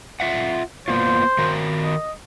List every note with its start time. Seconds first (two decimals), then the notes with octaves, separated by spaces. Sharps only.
0.20 F4 E5 F#5
0.88 A#3 B3 F4 C5
1.38 D#3 F#4 A#4
1.83 D#5